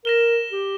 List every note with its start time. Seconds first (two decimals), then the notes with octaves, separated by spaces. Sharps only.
0.05 A#4 A#6 E7 G7
0.52 G4